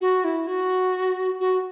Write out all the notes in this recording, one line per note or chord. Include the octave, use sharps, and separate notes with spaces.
F#4
E4
F#4
F#4